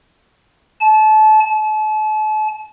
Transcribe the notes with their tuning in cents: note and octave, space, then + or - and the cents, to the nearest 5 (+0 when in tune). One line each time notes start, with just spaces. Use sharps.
A5 -30
A5 -40